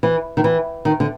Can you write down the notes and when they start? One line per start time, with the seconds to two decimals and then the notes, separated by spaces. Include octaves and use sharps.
0.03 E3
0.37 D#3
0.44 E3
0.85 D#3
1.00 D3